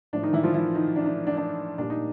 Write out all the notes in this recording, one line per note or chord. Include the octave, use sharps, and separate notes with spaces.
A2 F3 A3 D4
D#3 D#4
E3 E4
F3 F4
E3 E4
D#3 D#4
D4
D4
D4
D4
A#2 G3 D4
D#4